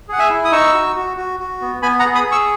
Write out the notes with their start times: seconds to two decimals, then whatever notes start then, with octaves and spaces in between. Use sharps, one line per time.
0.08 G#4 F#5
0.19 E5 G#5
0.30 E4
0.45 D#6
0.51 D#4 C#6 E6
0.73 F#4
0.96 F#4
1.17 F#4
1.40 F#4
1.61 B3
1.82 B3 G#5 B5
1.99 F#5 A#5
2.05 G#4
2.15 B5 D#6
2.26 G#4
2.32 C#6 E6